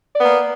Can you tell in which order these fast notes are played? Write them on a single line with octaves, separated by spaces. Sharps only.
D5 B3 A#3